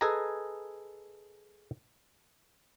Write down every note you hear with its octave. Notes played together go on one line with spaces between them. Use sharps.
G#4 A4 B4 D#5 G#5 A#5